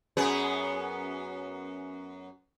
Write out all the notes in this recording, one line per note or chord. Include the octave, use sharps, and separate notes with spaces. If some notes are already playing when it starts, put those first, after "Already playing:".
F#2 B3 G#4